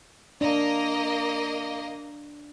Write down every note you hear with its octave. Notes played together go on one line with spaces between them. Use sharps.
A#3 D4 D#5